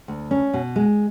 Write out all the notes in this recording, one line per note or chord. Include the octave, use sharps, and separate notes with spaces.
D2
C#4
B2
G#3